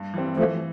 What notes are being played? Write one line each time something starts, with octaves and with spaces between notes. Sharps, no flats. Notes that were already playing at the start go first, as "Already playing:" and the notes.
Already playing: G2
E3 G3 C4
E3 F3 A3